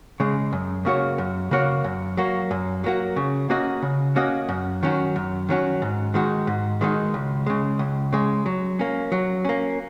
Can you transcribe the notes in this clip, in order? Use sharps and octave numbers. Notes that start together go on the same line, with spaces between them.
C#3 G#3
F#2
C#3 A#3 F#4 C#5
F#2
C#3 A#3 F#4 C#5
F#2
F#3 A#3 F#4
F#2
F#3 A#3 F#4
C#3
A#3 C#4 F#4 D#5
C#3
A#3 C#4 F#4 D#5
F#2
D#3 F#3 C#4 F#4
F#2
D#3 F#3 C#4 F#4
G#2
D#3 G#3 D#4 F#4
G#2
D#3 G#3 D#4 F#4
C#2
C#3 G#3
C#2
C#3 G#3
F#3
A#3 C#4
F#3
A#3 C#4